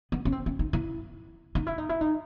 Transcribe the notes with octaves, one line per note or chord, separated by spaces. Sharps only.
B3
C#4
C4
C#4
D#4
E4
D#4
E4
D#4
E4
D#4